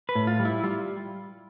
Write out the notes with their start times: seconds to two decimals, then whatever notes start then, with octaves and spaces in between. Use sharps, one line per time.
0.09 B4
0.15 A2
0.27 F4
0.40 G3
0.45 E4
0.64 G3 F4